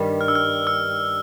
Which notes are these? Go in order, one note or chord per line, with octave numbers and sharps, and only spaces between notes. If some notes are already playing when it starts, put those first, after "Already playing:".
Already playing: G2 D#3 G3
F6
E6
F6
E6